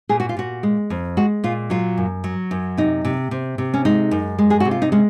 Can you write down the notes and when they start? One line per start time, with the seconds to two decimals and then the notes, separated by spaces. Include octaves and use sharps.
0.09 A#2 G#4
0.20 F#4
0.29 F4
0.37 A#2 F#4
0.63 G#3
0.90 F2
1.17 G#3 F#4
1.44 A#2 F4
1.70 F#3 F4
1.98 F#2
2.24 F#3
2.51 F#2
2.78 C3 D#4
3.05 C3
3.31 C3
3.58 C3
3.74 C#4
3.85 G#3 D#4
4.11 F#2
4.38 G#3
4.50 G#4
4.60 C3 F#4
4.71 F4
4.82 D#4
4.92 G#3 C#4